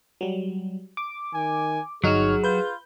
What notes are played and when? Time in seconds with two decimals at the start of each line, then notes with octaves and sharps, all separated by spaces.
0.21 F#3 G3
0.97 D6
1.34 D#3 G#5
2.04 G1 F#3 D#4 F#4 G#4 C#5 F6
2.44 F4 B4 G6